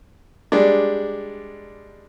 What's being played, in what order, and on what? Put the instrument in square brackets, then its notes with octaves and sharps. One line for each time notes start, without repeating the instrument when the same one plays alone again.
[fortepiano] G3 G#3 D4